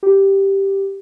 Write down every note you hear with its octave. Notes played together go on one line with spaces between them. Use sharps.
G4